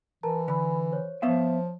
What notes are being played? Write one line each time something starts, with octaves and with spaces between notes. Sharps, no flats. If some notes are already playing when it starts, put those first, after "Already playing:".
E3 A#4 A5 A#5
D3 G#5 B5
C5 C#5
F3 B3 E5 F5